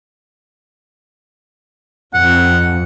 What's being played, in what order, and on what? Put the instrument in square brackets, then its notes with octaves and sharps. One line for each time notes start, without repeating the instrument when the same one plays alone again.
[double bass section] F2 [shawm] F#5